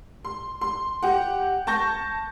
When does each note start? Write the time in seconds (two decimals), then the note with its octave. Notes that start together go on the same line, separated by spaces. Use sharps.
0.25 C6
0.61 C6
1.03 G4 F#5
1.67 A5 C#6 G6 A#6